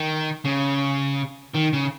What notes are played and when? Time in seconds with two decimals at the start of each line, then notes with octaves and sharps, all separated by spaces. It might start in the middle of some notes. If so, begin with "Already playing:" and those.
Already playing: D#3
0.45 C#3
1.54 D#3
1.73 C#3